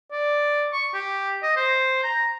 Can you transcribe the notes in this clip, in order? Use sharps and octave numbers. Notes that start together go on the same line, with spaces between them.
D5
C#6
G4
D#5
C5
A#5